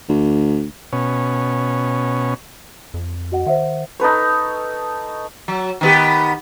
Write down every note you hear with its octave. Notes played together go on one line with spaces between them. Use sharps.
D2
B2 C#4
F2
F#4 D#5 F#5
D#3 C5 E5 F#5
D#4 A4 B4 C#5
F#3
D#3 B3 G4